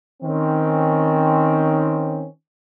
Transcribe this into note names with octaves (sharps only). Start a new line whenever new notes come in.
D#3 C4 C#4